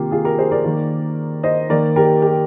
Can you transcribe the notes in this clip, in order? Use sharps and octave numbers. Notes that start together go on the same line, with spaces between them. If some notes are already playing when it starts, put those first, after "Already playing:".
Already playing: C3 D#3 A#3 F4 G4
F4 G#4
G4 A#4
G#4 C5
A#4 D5
D#3 A#3
C5 D#5
D#3 A#3 A#4 D5
G4 A#4
G4